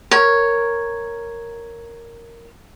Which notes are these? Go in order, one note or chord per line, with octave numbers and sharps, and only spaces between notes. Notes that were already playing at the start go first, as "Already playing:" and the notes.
A#4 C#5